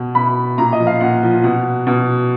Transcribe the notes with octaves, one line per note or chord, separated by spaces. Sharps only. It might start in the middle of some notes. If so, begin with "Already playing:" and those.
Already playing: B2
B2 B5
A#2 A#5
D#5
F3
F5
A#2 F#5
F3
B2 F#5
B2